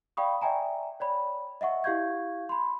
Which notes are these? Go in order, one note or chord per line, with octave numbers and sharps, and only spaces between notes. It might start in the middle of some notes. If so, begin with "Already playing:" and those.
D5 F5 G5 B5 C#6 D#6
D5 E5 G5 G#5 A#5
C#5 D5 B5
D#5 E5 F#5 C#6
E4 G4 F5 C#6 G6 G#6
B5 C6